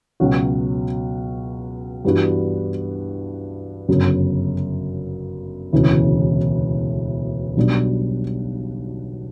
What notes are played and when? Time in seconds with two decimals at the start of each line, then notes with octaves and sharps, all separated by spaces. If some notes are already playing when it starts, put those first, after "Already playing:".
0.20 C#2 B2 F#3 C#4 F#4
2.05 G2 E3 B3 D4 F#4
3.88 G1 F#2 C#3
5.73 E1 D2 C#3 E3
7.56 B1 B2 G3 D4